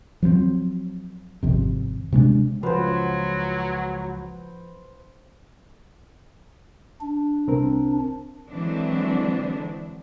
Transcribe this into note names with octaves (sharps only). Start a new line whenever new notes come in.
F3 F#3 A3 C4
G#1 F2 C3
C3 G#3 C#4 D4
C#2 F3 F#3 B4 C5
D4
C2 C4 A#4
D3 E3 F#3 G#3 C4 D4